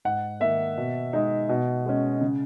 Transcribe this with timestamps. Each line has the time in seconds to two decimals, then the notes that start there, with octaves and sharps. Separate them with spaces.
0.05 G#2 F#5
0.40 D#3 A#3 E5
0.77 B2
1.13 G#3 D#4
1.49 B2
1.86 G#3 C#4
2.21 C#3